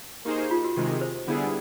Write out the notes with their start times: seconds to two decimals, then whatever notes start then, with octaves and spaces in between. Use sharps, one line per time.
0.25 A#3 D#4 G4 G#4 C5
0.38 G4
0.51 F4
0.64 F#4
0.77 C3 D#3 G#3 G4
1.01 C5
1.27 D3 G3 B3 E4 G#4